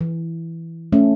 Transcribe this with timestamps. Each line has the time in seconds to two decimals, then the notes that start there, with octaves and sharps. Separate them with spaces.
0.01 E3
0.92 A3 C#4